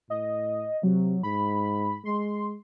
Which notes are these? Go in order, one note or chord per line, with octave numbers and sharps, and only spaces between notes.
A2 D#5
C3 F#3
G#2 B5
G#3 C6